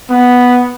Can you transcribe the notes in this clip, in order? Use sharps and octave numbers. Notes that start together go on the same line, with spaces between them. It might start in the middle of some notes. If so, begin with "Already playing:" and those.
B3